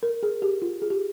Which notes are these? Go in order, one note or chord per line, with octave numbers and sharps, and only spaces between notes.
A#4
G#4
G4
F4
G#4
G4